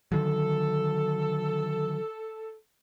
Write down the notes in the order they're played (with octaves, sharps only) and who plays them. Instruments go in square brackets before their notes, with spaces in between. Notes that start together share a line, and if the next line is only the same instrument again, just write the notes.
[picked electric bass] D3 D#3 F#3 [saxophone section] A4